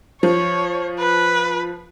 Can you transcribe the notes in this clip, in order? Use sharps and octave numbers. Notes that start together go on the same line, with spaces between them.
F3 C#5
B4